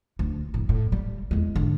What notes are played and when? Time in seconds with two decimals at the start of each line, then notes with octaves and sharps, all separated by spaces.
0.19 D2
0.54 F2 A2
0.69 A2
0.92 G3
1.31 E2 G#3
1.56 G#2 D3